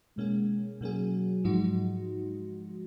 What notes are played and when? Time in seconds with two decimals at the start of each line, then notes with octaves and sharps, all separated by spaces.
0.17 B2 G#3 A#3 C#4 G#4
0.81 B2 F#3 A#3 C#4 G#4
1.44 G#2 F3 G#3 D#4 F#4